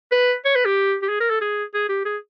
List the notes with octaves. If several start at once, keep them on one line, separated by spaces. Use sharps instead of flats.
B4
C#5
B4
G4
G4
G#4
A#4
A4
G#4
G#4
G4
G#4